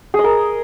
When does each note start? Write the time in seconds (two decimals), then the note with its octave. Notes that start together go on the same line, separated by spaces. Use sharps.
0.14 G#4
0.19 D#5
0.24 A#4